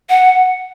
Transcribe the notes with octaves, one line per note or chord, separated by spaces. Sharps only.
F#5